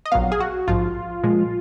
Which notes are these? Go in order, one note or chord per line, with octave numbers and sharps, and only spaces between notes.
D#5
A#1 A#2 F#3 B3 F5
G#4
F#4
A#1 G#2 F3 F4
A#2 F3 G#3